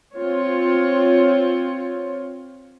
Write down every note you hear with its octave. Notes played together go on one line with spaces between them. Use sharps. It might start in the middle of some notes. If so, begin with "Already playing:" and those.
C4 F4 C#5